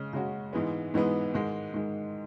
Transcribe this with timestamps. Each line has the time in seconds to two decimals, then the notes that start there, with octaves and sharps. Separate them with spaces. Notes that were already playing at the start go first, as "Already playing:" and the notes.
Already playing: C#3 G#3 C#4
0.13 C#3 G#3 C#4 F#4
0.53 G#2 E3 G#3 B3
0.94 G#2 E3 G#3 B3
1.34 G#2 D#3 G#3
1.73 G#2 D#3 G#3